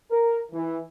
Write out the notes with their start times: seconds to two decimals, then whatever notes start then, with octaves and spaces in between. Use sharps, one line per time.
0.11 A#4
0.52 E3